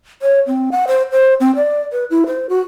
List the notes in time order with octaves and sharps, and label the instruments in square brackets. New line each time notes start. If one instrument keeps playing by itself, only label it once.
[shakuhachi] C#5
C4
F#5
C5
C5
C4
D5
B4
E4
C5
F#4